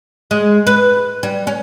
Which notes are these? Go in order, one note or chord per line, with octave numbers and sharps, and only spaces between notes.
G#3
B4
G3
C#4